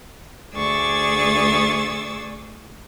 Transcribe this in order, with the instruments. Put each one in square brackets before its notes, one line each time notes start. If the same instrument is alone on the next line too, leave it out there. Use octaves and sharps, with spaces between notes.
[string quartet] D2 G#4 D5 C#6 E6 A6